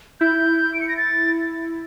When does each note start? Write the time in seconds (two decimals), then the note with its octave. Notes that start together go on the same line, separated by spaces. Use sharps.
0.20 E4 G6
0.74 D7
0.81 C#7
0.89 A#6
0.97 A6